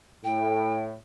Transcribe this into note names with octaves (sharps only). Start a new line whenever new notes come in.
A2 G5